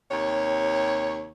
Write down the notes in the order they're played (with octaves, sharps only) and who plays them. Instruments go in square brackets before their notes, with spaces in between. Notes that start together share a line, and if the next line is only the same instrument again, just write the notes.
[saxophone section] D#2 C3 C#5